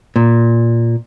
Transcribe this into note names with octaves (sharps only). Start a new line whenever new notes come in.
A#2